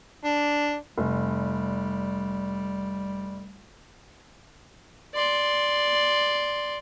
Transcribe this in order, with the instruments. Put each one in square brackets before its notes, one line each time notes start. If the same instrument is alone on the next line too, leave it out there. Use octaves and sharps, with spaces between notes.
[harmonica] D4
[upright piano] F1 [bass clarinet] G3
[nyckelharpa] D5 C6